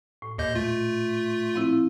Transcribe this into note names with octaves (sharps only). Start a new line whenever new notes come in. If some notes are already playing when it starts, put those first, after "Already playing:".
A2
D#2 A#2 D#5 G6
A3 F4
F3 C4 E4